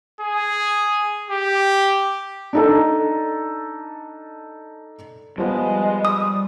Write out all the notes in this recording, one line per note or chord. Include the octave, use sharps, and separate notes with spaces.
G#4
G4
D4 D#4 A4
F3 G3 G#3 B3
D#6